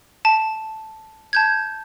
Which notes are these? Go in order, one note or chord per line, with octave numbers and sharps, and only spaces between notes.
A5 D#7
A5 G6 G#6